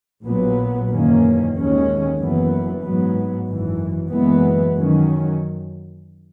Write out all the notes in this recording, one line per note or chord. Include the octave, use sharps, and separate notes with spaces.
A#1 A#2 F#3 B3
F#1 E2 D#3 A#3 C#4
D#2 D#3 G#3 C#4
F#1 F#2 E3 B3
G#2 F#3 B3
G#1 F#2 E3
F#1 F#2 E3 G#3 B3
F#2 D#3 F#3 C#4